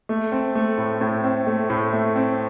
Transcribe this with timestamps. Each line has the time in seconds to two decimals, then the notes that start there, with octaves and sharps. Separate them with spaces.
0.09 A3
0.32 C4
0.55 A3
0.78 A2
1.01 A2
1.24 C4
1.47 A3
1.70 A2
1.93 A3
2.16 C4